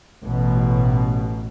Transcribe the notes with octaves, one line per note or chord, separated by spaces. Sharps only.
A1 B2